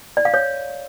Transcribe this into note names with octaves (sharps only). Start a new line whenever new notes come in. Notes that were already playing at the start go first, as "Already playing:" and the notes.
D5
F5
C#5